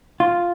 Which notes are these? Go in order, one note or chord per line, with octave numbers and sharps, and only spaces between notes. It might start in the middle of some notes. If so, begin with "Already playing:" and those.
F4